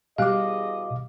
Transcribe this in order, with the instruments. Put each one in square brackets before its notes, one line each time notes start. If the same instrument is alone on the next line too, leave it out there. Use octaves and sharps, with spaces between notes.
[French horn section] E2 G#4 D#5 [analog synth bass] B2 [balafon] G3 G4 [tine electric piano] F5 D6